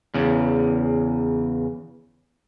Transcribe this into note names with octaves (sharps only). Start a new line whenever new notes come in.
E2 C#3